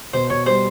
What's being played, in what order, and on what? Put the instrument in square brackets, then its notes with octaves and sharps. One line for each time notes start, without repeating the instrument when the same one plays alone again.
[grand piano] B2 [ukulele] C5
[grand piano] B2 [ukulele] C#5
[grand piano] G3 [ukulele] C5